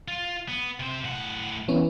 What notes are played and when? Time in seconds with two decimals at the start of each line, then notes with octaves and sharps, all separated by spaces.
0.08 F4
0.48 B3
0.80 C3 C5
1.04 A2 F#5
1.68 E3 B3 C#4